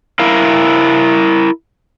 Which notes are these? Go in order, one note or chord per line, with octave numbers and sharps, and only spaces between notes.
E4 A#4 F5